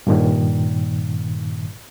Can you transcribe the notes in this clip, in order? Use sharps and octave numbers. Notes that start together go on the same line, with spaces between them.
G2 A#2 D#3